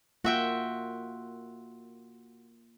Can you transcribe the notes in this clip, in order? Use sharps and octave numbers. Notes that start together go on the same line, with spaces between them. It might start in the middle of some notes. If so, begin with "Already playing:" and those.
A#3 F4 F#4 E5 G5